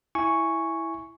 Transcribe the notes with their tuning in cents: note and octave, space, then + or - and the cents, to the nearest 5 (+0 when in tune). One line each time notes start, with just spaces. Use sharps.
E4 +0 G#5 +0 C#6 +0